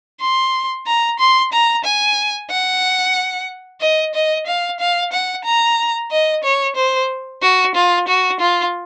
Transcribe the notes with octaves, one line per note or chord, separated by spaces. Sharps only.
C6
A#5
C6
A#5
G#5
F#5
D#5
D#5
F5
F5
F#5
A#5
D#5
C#5
C5
F#4
F4
F#4
F4